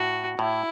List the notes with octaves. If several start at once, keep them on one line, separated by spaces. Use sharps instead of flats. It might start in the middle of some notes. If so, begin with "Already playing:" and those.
Already playing: A2 F#4
A2 E4